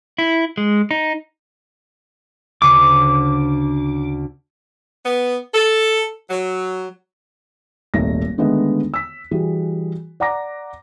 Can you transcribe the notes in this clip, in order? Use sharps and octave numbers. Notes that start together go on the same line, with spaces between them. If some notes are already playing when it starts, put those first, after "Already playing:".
E4
G#3
D#4
D2 C#3 D4 D6
B3
A4
F#3
D#1 G#1 A3 D#4 A#6
D3 D#3 G#3 A3 B3 D#4
E6 B6
E3 G3 F#4 G#4
D5 F#5 A#5 D6 A#6